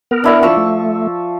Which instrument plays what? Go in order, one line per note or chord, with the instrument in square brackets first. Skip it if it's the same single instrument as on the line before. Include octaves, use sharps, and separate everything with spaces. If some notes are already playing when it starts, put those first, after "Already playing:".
[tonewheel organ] B3 A#4
[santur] D4 E4 D5
F3 C#6 E6
[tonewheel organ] A3